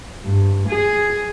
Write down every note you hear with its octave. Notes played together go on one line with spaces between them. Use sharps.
G2
G#4